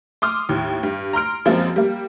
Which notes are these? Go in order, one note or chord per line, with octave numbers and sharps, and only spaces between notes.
C6 D6 D#6 F6
D#2 A2
G2
A#5 C6 F6 D7
F#2 F3 G#3 A#3 C4
G3 A#3